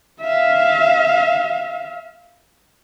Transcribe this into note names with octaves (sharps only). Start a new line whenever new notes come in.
E5 F5